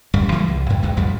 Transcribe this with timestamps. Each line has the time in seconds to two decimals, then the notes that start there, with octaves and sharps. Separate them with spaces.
0.14 D1 F#2 G3
0.32 E3 G3 G#3 A#3
0.48 C2
0.70 F#2
0.83 E2 F#3 G#3
0.97 A1 F2 F3 G3